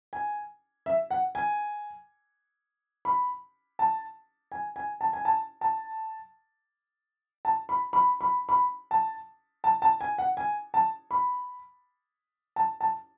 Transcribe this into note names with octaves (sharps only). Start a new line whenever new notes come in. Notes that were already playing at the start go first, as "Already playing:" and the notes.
G#5
E5
F#5
G#5
B5
A5
G#5
G#5
A5
G#5
A5
A5
A5
B5
B5
B5
B5
A5
A5
A5
G#5
F#5
G#5
A5
B5
A5
A5